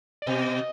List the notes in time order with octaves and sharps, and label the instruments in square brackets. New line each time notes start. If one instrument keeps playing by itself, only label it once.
[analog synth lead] D5
[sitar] B2 [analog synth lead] D#5